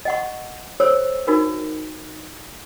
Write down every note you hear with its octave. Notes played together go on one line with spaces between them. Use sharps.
D#5 F#5 C#6
A4 C5 C#5 E6
D#4 F#4 A#4